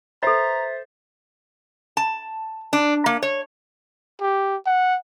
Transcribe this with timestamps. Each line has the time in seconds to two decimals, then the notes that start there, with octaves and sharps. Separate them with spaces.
0.23 A4 B4 C5 E5 A#5 A6
1.97 A5
2.73 D4
3.06 A#3
3.23 C#5
4.21 G4
4.66 F#5